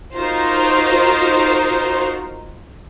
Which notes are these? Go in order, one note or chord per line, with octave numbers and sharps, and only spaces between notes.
D#4 F4 F#4 A#4 C5